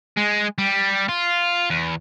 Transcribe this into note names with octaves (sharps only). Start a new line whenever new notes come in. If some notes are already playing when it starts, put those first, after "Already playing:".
G#3
G3
F4
E2